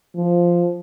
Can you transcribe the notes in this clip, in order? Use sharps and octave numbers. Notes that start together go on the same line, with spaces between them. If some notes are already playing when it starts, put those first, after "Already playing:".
F3